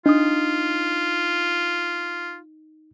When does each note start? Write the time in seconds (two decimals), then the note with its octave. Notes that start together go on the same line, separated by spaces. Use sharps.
0.06 D4 D#4 F4 D#6